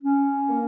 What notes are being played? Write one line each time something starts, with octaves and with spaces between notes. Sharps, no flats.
C#4
A#3